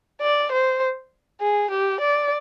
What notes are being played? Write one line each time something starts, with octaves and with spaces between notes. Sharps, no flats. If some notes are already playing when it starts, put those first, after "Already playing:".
D5
C5
G#4
G4
D5